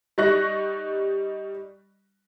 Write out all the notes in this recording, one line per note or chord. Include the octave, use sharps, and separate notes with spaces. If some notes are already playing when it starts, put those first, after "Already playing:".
G3 D#4 C#6 F#6 A#6